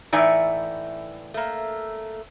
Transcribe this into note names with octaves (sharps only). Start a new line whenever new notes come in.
A2 E3 D#4 D5 E5 G#5
A3 A#3